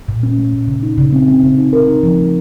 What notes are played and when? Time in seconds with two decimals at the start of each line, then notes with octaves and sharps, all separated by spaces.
0.08 A#2
0.23 C#4
0.38 A3
0.53 A#2
0.67 C#3
0.83 D#4
0.98 C#3
1.13 C4
1.28 C4
1.43 C#3
1.58 D#4
1.73 A#4
1.88 D#4
2.03 F3
2.18 A3